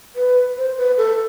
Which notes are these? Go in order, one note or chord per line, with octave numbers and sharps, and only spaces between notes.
B4
C5
B4
A4